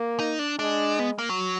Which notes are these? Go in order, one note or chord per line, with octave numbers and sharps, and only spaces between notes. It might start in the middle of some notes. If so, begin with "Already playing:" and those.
Already playing: A#3
D#4
D4
G#3 D4
B3
A#3
F#3